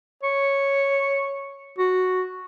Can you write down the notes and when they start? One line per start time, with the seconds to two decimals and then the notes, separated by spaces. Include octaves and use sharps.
0.23 C#5
1.79 F#4